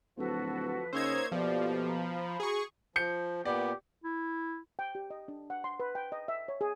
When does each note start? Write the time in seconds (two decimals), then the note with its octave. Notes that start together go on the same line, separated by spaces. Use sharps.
0.17 D1 F3 F#4 A4 B4
0.93 C#3 A#3 D#4 C5 C#5 E6 G#6
1.32 B2 F3 A3 A#3 G4 D5
1.87 A#5 B5
2.40 F#4 G#4 C#6
2.96 F3 G6 C#7
3.45 A#2 B3 G4 D5
4.04 E4
4.79 G5
4.95 G4
5.10 D#5
5.28 D4
5.50 F#5
5.64 C6
5.80 B4
5.95 G5
6.12 D#5
6.28 E5
6.48 C#5
6.61 G#4